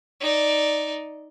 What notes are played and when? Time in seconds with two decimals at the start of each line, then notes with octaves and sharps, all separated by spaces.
0.21 D#4 D5